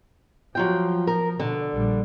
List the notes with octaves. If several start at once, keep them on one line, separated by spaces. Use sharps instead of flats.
F3 F#3 F4 G5
A#4
B2 D3
A#1 G3